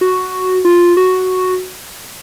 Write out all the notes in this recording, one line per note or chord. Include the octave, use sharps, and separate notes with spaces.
F#4
F4
F#4